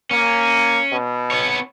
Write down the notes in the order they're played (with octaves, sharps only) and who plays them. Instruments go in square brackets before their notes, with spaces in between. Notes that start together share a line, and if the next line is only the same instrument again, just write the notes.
[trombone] A#3 [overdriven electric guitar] C#4
[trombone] B2
[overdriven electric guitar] B3 C#5